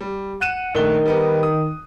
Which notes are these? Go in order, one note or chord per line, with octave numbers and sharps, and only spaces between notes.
G3
F#5 F#6 D#7 E7
A#1 D#3 A3 G7
G3 B3 D#4
D#6